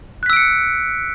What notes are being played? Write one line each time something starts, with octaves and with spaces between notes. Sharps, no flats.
E6 F#6 B6 C#7 D7